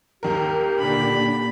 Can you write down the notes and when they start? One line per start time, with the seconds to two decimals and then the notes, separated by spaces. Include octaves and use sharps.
0.23 D#2 D#3 G4 A#4
0.79 A#2 D3 D4 B5